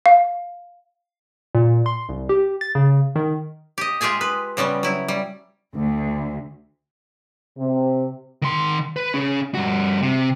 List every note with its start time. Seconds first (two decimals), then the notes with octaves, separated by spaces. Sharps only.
0.06 F5
1.55 A#2
1.86 C6
2.09 C2
2.29 G4
2.61 A6
2.75 C#3
3.16 D#3
3.78 G4 D#5
4.01 G#3 F4 G4 G#4 G#5
4.21 B4
4.57 C#3 G3 B3 C#4
4.83 F#3 E4
5.08 G3
5.75 D2
7.57 C3
8.42 D#3 C6
8.96 B4
9.14 C#4 G#4
9.55 G2 F#4
10.02 C3